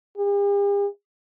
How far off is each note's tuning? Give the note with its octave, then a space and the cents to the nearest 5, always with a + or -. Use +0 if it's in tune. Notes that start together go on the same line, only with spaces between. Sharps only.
G4 +45